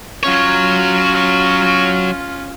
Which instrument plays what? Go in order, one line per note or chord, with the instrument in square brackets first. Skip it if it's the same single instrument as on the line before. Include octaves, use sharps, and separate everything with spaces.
[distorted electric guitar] F#3 C#5 [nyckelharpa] C#4 F4